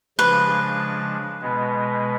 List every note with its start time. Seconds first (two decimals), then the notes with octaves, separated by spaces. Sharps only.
0.18 C#3 F3 G#3 D4 B4
1.41 B2 G#3 B3